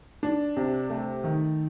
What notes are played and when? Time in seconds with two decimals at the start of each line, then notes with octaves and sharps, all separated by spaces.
0.23 D4
0.57 C3
0.90 A3
1.24 D#3